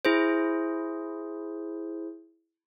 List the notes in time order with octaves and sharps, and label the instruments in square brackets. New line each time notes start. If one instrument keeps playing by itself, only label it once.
[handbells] E4 G#4 C5